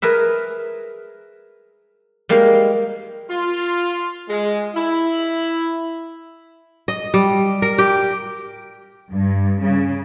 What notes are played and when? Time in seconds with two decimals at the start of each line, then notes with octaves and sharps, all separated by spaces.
0.02 G#4 A#4 B4 E5
2.29 G3 G#3 A#3 D#4 F5
3.29 F4
4.29 G#3
4.75 E4
6.88 D#5
7.14 G3
7.62 A#4
7.78 G4
9.11 G2
9.62 C#3